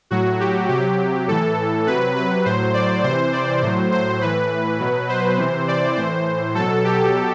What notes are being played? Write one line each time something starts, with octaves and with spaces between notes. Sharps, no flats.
A2 F#3 F#4
G4
C3 F#3 G4
A2 E3 A4
C3 F#3 B4
B4
A2 F#3 C5
D5
C3 E3 C5
D5
A2 F#3 C5
C5
A2 E3 B4
B2 F#3
C5
C3 E3
D5
A2 E3 C5
B2 F#3 A4
G4